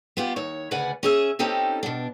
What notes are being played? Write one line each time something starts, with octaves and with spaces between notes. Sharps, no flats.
B3 F4 G4
D#2 C#5
D2 C#3 B4 D5 F#5 G#5
C#4 G#4 E5
C4 C#4 D#4 G4 A4
B2 D4